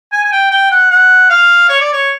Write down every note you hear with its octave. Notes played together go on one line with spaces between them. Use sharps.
G#5
G#5
G5
G5
F#5
F#5
F5
C#5
D5
C#5